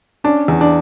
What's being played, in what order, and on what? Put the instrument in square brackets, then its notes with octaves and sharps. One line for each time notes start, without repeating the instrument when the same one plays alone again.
[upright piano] C#4 [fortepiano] D4
[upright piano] E2
[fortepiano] D4